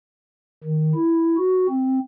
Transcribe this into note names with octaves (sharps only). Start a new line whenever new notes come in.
D#3
E4
F#4
C4